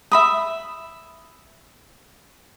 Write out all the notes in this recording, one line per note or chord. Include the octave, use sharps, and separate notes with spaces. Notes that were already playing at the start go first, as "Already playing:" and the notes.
E5 B5 D#6